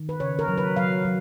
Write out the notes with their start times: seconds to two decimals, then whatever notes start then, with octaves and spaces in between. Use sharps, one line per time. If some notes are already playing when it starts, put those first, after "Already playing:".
Already playing: D#3
0.09 B4
0.20 C#3 C#5
0.39 A#4
0.48 F#3
0.58 B4
0.76 F#3 F5
1.05 F#3